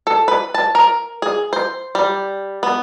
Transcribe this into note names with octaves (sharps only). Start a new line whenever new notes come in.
A4
B4
A5
A#4
G#4
C5
G3
B3